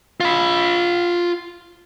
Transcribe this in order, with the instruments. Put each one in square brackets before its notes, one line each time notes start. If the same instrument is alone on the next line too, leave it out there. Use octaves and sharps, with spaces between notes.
[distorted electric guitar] F4 B5